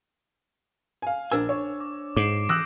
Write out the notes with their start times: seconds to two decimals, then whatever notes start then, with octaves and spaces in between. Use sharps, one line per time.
1.02 F5 G#5
1.32 A#1 D4 A#4 C5 G#5 E6
1.49 C#5
1.80 D6
2.17 G#2 D6 C7 D7
2.49 E3 D#6 E6 F#6 G6 A#6